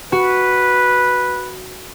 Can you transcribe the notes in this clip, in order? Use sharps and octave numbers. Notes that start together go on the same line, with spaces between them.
F#4 B4